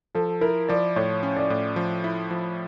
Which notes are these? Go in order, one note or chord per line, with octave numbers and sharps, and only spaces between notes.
F3 A4
E4 A#4
F3 D5
A2 C#5
C#4
D5
A2
F3
E4
F3